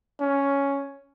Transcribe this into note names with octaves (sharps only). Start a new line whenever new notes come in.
C#4